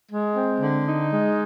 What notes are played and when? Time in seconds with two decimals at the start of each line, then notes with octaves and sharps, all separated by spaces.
0.10 G#3
0.36 C4
0.60 D3
0.86 D#4
1.10 G#3